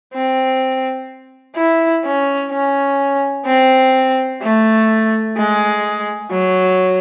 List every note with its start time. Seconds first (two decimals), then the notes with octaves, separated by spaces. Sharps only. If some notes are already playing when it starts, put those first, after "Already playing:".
0.14 C4
1.56 E4
2.05 C#4
2.51 C#4
3.46 C4
4.42 A3
5.37 G#3
6.31 F#3